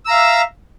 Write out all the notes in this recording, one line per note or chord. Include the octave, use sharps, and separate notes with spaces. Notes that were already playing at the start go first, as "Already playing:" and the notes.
E5 F5 A#5 E6